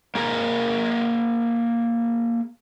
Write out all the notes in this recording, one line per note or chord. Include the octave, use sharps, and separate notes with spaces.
A#3 G#4 A#4